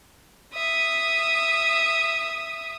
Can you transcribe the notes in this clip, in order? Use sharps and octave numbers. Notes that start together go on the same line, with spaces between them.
E5 D#6